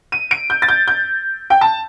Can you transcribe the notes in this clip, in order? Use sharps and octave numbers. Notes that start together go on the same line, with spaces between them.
D#7
D7
G6
A6
G6
G6
G5
A5